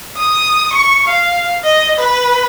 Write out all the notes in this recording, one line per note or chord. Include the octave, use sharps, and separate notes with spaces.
D#6
C#6
F5
D#5
B4